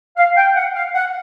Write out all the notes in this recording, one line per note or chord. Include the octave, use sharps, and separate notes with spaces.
F5
G5
F#5
F5
F#5